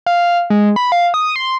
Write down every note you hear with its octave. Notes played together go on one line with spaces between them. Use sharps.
F5
G#3
B5
F5
D#6
C6